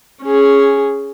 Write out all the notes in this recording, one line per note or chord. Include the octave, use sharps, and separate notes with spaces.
C#4 G#4